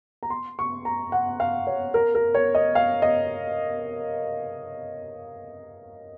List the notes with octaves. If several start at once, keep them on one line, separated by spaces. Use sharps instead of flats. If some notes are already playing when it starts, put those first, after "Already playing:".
A#5
C6
C#6
A#5
F#5
F5
C#5
A#4
A#4
C#5
D#5
F5
D#5